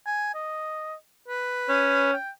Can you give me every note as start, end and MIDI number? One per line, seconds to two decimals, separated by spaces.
0.06 0.33 80
0.35 0.94 75
1.28 2.09 71
1.69 2.12 61
2.13 2.30 79